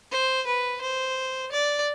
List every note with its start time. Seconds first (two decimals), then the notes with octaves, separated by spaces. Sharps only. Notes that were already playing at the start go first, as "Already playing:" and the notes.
0.11 C5
0.47 B4
0.82 C5
1.51 D5